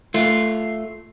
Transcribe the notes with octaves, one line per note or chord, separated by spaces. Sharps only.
A3 F4